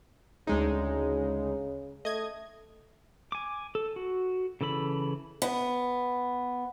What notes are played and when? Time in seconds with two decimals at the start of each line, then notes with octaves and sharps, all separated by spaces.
0.47 D2 C#3 G#3 D#4
2.05 A3 D#5 G#6
3.32 G#5 D6
3.75 A4
3.96 F#4
4.61 C#3 E3 A4 B5
5.42 B3